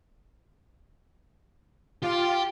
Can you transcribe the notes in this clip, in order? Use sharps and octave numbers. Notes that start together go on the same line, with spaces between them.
F4 G4